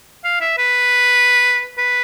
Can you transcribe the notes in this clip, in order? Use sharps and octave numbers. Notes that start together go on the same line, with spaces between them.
F5
E5
B4
B4